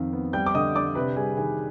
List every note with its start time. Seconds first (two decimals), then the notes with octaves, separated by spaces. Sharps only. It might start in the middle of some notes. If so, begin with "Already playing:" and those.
Already playing: F2 D#3 F5
0.13 B3
0.33 G3 G5 G6
0.46 D6
0.54 D3 D#5 D#6
0.75 D4 D5 D6
0.95 C3 B4 B5
1.16 G3 G#4 G#5
1.37 D#3 G#4 G#5